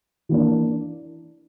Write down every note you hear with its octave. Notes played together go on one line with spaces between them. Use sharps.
E3 A#3 D4